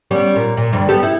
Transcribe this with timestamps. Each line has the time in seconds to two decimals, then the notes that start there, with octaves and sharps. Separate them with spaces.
0.11 G3 B3 C#4
0.36 A#2
0.57 A#2
0.73 D2 G2
0.89 B3 G4 A4
1.03 E4